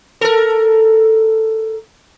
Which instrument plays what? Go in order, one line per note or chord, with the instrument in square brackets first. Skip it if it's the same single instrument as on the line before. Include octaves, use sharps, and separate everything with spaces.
[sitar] A4 A#4